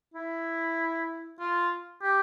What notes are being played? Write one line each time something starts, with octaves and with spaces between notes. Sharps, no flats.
E4
F4
G4